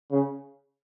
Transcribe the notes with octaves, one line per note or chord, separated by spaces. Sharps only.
C#3